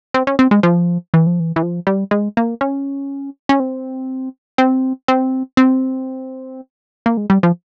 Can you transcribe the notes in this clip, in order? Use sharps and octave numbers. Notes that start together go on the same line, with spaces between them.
C4
C#4
C4
G#3
F3
E3
F3
E3
E3
F3
G3
G#3
A#3
C#4
C#4
C4
C4
C4
C4
A#3
G#3
G3
F3